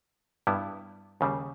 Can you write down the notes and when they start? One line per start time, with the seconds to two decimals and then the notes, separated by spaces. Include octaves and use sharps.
0.47 G2 G3 B3 E4
1.21 D#2 C#3 G3